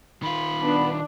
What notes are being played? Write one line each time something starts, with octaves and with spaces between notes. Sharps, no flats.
D#3 F4 B5
B3 D4